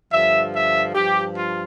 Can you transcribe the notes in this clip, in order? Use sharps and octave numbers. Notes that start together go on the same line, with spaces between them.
G2 D3 F3 E5
E5
G2 F3 G4
F4